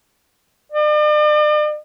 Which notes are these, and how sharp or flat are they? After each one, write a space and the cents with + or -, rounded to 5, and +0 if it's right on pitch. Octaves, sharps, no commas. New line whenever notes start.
D5 +45